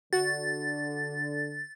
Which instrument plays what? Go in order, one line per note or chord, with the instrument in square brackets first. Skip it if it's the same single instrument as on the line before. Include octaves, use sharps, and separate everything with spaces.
[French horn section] D3 [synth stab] F#4 [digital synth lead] A6